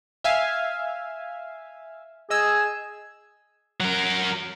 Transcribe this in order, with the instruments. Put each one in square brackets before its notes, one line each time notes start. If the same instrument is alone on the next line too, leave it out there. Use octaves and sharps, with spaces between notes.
[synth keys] E5 F5 G#5
[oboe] G#4 [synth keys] D#5 E6
[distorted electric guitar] F#3 A#4